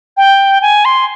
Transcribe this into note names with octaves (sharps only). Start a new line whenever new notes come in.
G5
G#5
C6